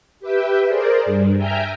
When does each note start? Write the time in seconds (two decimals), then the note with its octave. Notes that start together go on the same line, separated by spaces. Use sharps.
0.20 G4 B4 E5 G5
0.67 G#4 A#4 C5 D5
1.06 G2
1.36 E5 G5 G#5 A#5 F6 G6